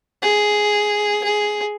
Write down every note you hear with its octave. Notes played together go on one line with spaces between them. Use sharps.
G#4
G#4